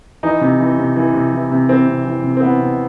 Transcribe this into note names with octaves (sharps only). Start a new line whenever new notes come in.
E3 D#4
C3
E3
C3
E3
C3
E3
C3
E3 C4
C3
E3
C3
C4
E3 B3
C3